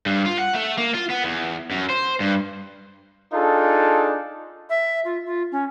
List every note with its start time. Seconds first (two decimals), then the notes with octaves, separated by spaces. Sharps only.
0.06 G2
0.26 F4
0.38 F#5
0.54 A3
0.78 A#3
0.94 F4
1.10 B3
1.24 E2
1.71 F#2
1.90 C5
2.20 G2
3.33 D4 D#4 F4 G#4 A4
4.69 E5
5.04 F4
5.25 F4
5.51 C#4